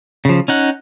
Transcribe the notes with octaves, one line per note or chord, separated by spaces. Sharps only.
C#3 F3
C#4 D#4 F#5